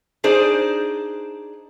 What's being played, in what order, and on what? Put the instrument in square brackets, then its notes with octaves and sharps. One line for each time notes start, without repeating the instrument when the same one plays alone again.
[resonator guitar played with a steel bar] D4 D#4 G#4 C5 D5